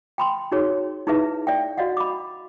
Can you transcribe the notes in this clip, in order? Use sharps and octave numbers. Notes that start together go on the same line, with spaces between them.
G5 B5 C6
D#4 F#4 G#4 C#5
D#4 E4 G#4 B4 E5
D5 E5 G5
F#4 D5 D#5 F5 F#5
B5 D6